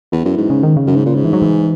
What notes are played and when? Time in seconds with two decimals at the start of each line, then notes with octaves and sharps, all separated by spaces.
0.12 E2 E3
0.25 F#2
0.38 G#2
0.50 C#3
0.63 D#3
0.77 C#3
0.87 F#2
0.96 G#2
1.06 A#2
1.15 G#2
1.24 E3
1.33 F#3
1.42 E3